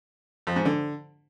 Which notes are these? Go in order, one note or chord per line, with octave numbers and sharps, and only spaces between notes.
F2
G#2
D3